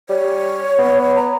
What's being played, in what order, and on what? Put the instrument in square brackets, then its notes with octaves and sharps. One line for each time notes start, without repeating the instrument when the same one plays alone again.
[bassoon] G3 [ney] C#5
[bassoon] B3
[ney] A#5